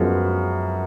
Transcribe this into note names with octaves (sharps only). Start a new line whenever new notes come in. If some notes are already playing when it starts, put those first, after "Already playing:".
Already playing: F#2 F3 G#3 B3